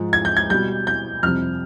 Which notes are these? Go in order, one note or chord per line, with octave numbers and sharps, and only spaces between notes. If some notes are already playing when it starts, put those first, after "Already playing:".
Already playing: G#2 F3 G#3
G#6
G6
G#6
B2 G3 G6
G6
F2 C3 G3 F6